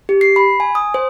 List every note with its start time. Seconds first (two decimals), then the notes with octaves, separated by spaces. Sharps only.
0.09 G4
0.21 C7
0.36 B5
0.60 G#5
0.75 D#6
0.94 C5